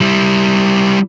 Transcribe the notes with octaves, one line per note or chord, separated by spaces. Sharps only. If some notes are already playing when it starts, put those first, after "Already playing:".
G3 E4